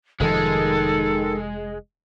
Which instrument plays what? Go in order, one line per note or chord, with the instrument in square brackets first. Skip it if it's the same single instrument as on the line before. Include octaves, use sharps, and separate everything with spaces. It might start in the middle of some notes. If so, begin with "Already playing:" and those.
[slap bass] F1 G#2 F3 [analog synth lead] D#3 [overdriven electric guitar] G#3 [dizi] A4